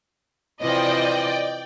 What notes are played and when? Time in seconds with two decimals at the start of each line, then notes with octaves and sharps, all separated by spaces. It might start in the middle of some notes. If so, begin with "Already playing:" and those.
0.61 C3 E3 F3 D5 D#5 G5